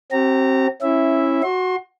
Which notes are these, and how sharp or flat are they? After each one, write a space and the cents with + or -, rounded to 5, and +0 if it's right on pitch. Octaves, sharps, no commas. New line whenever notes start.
C4 +25 G4 -40 A#5 -25
C#4 -30 E4 +0 E5 -5
F#4 +0 C6 +30